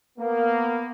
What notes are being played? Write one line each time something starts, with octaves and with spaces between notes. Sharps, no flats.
A#3 B3